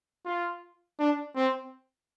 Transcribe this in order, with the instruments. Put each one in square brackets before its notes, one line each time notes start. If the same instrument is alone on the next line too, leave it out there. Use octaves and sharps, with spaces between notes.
[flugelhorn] F4
D4
C4